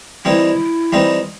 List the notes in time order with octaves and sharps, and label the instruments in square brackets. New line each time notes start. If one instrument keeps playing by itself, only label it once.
[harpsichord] E3 G3 C4 D#4 [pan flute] E4
[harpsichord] E3 G3 C4 D#4